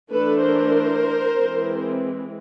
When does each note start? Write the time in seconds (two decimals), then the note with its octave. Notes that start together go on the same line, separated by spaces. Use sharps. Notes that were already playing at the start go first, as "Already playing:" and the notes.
0.10 E3 A3 D4 A4 B4
0.42 A#4 C5
1.37 E3 G#3 C4